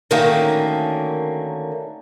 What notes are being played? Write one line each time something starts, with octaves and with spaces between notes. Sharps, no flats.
D3 D#3 F#3 A3 A#3 C#4